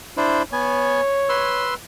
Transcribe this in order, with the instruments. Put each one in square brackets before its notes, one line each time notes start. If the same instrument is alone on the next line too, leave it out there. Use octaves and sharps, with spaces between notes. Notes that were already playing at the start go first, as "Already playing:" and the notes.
[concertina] D4 E4 C5
[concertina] B3 G#5 [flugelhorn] C#5
[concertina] B4 C6 E6